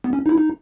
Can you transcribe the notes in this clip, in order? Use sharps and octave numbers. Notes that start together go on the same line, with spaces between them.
B3
C#4
D#4
E4
D#4